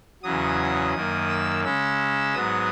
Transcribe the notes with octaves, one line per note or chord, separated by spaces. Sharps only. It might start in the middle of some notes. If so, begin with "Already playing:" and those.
E2 C#3 F#3 D#6
F#2 D#3 A#3
E6
C#3 G#3 C#4 E6
G#2 F#3 B3 D#6